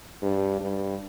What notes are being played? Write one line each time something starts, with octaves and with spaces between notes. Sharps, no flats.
G2
G2